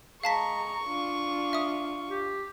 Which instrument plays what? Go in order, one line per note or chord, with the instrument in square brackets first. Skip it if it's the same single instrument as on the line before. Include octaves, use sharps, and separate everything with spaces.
[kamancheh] G#3 A#5 [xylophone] F5 A5 B6 [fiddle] C#6
[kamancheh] D4 F4
[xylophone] E5 D#6
[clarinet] G4